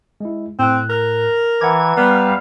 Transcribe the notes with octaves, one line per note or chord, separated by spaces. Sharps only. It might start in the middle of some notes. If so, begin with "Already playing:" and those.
G#3 E4
A2 C4 F#6
A#4
E3 F#5 A#5 D6 G#6
G3 B3 F5